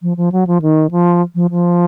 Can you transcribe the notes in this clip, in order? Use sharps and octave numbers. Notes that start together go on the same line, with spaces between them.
F3
F3
F#3
F3
D#3
F3
F3
F3